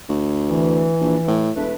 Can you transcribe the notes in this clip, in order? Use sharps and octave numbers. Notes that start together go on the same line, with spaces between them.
D2
E3
A#1
A2
E1 A3 D4 B4